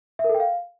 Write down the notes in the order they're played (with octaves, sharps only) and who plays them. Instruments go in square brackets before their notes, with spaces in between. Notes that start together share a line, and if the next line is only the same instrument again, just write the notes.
[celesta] E5
A#4
A4
G5
F5